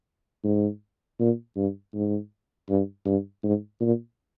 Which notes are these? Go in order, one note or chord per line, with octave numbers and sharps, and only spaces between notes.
G#2
A#2
G2
G#2
G2
G2
G#2
A#2